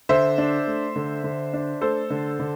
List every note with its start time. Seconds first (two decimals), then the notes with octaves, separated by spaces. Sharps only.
0.09 D3 C5 E5
0.38 D4
0.67 A3
0.96 D3
1.24 D3
1.53 D4
1.81 A3 A4 C5
2.10 D3
2.40 D3